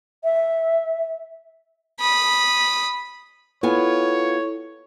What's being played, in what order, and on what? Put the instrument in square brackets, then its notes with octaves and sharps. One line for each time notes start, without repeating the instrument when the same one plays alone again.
[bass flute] E5
[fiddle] B5 D#6
[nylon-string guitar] B3 F4 G#5 [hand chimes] E4 A4 [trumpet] C#5